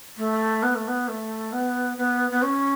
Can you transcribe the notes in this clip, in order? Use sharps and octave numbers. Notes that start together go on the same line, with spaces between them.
A3
B3
A3
B3
A3
B3
B3
B3
C#4